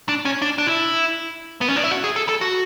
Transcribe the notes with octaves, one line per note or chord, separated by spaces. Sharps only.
D4
C#4
D4
D4
E4
B3
C#4
D4
E4
F#4
G#4
A4
A4
F#4